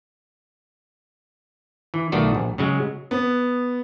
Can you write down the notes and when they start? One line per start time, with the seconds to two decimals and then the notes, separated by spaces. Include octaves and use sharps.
1.94 E3
2.12 B1 D#3 A3 F4 F#4 D5
2.35 A#1
2.58 C#3 F#3 G#3
3.11 B3